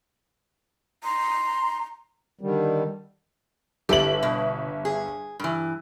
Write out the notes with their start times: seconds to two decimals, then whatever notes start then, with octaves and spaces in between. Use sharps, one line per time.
1.04 A#5 C6
2.41 D3 D#3 G3
3.89 G1 G4 A4 E5 F#7
4.23 B2
4.85 G#4
5.40 G2 E3